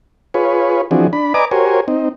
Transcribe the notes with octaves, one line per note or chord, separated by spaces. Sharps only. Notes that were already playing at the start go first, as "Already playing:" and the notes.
F4 G#4 B4 C#5
E3 F3 C4 D4 F#4 G#4
D4 B5
B4 D5 D#5 G#5 A#5 D6
F#4 G4 A#4 C5 C#5 G#5
C4 D#4